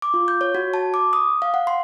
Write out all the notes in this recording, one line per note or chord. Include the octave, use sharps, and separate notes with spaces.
D6
F4
G6
C#5
F#4
A5
D6
D#6
F5
F#5
C6